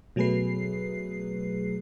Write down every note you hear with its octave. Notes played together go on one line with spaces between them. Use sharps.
B2 F#3 A3 G#4 B4 C7